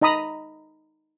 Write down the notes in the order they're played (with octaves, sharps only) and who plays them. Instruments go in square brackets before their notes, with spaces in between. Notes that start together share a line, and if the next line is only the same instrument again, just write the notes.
[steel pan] D#4 D#5 A#5 B5 D#6